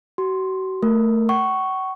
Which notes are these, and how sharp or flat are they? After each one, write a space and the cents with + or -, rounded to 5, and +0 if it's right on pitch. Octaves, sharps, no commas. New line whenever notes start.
F#4 +40 C6 +0
A3 +15 A#4 +0
F#5 +40 C#6 +0